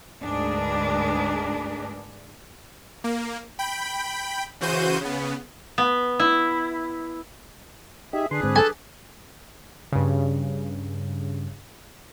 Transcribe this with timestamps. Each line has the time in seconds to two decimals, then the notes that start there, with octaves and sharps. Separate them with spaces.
0.22 D2 G#2 D4 G#4 A#4 B4
3.04 A#3
3.59 G5 B5
4.61 C#3 E3 F#4 C5 G6 D#7
5.01 C#3 B3
5.78 B3
6.20 E4
8.13 D#4 G4 G#4 E5
8.31 D3 D4 G#4 B4 C6
8.43 G#2 D3 C4
8.56 A4 G#5
9.93 G2 C#3